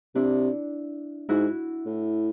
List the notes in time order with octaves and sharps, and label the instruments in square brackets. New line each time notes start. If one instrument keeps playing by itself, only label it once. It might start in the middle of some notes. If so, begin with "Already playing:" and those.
[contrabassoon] C3 [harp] D4 E4
[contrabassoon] G#2 [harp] E4 F#4
[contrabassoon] A2